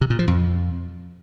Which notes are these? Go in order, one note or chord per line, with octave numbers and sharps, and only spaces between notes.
C3
A#2
F3
F2